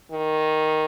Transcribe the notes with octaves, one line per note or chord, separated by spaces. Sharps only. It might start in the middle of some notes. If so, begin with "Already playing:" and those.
D#3